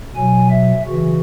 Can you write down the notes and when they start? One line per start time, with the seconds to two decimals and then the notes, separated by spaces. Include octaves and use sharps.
0.15 B2 F#3 G#5
0.51 E5
0.86 C#3 E3 F#4